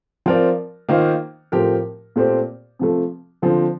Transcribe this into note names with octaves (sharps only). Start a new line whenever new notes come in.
F3 C4 F4 A#4 D5
D#3 A#3 F4 C5
A2 F3 C4 G4 A#4
A#2 A3 C4 G4 C5
C3 F3 A3
D3 F3 C4